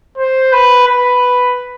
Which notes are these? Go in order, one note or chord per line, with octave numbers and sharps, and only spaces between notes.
C5
B4
B4